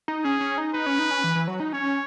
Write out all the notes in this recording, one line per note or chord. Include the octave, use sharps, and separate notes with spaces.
D#4
C#4 G#4
C#4
D#4
D#4 B4
C#4
D#4
C#4
E3
E3
F#3
D#4
C#4 C#5